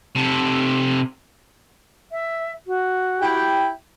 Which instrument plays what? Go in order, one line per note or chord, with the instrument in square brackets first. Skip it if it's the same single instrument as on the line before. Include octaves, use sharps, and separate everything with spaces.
[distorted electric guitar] C3 A4
[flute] E5
F#4
[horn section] E4 G4 G5